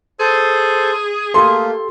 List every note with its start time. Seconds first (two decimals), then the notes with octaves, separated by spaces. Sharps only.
0.19 G#4 A4 C5
1.34 A3 A#3 G4 A4 C6